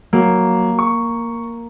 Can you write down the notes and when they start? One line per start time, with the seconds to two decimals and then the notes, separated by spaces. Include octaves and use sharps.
0.13 F#3 A#3
0.79 C#6